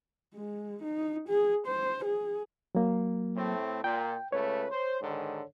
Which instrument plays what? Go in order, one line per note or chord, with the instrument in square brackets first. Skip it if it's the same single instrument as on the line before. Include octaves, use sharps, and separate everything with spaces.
[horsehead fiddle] G#3
D#4
G#4
C5
G#4
[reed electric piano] F#3 A#3
[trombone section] A2 A3 C4
[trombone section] A#2 [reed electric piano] G5
[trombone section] C#2 A3 B4 [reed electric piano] C#5
[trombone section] C5
G#2 D3 D#3